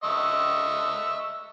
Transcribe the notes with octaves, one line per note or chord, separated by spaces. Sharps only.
D#5 E5 C#6